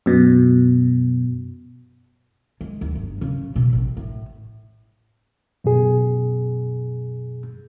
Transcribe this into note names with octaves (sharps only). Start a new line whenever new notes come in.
F#2 B2
G#3
D#2
G1
C#3
B2
A1
A2
F#2 B2 G#4